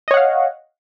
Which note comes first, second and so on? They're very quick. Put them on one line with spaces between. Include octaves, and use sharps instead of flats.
D#5 C#5 F#5 F5